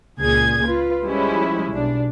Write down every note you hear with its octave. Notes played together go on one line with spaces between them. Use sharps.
C#2 A#2 G#4 G#6
F4 B4
F3 G3 G#3 C#4 E4
B1 D4